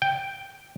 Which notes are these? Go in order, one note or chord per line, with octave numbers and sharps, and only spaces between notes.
G5